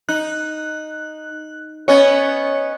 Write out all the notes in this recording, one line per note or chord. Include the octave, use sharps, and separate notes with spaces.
D#4 F#6
B3 C#4 C#5 D#5